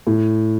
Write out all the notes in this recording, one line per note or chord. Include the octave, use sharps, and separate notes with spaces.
A2